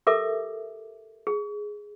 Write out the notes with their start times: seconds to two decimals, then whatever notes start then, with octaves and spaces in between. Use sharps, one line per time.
0.07 G4 A4 A#4 E5 D6
1.27 G#4